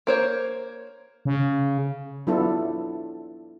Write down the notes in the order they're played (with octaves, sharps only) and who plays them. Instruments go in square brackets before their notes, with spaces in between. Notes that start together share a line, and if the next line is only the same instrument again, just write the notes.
[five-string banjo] A#3 C5 C#5
[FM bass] C#3
[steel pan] F#3 B3 D4 E4 F4 A4